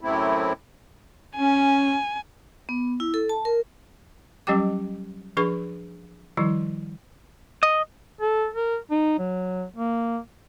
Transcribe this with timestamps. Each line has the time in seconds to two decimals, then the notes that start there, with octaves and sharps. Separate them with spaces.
0.01 F#2 A2 C3 A3 C4 E4
1.37 C#4 G#5
2.69 B3
3.00 E4
3.14 A4
3.29 A5
3.45 A#4
4.47 F#3 G3 C#4 G4 G5 D6
5.37 F3 D4 G#4 B4 C#6
6.37 D#3 F3 G3 E4
7.63 D#5
8.21 A4
8.54 A#4
8.91 D#4
9.19 F#3
9.76 A#3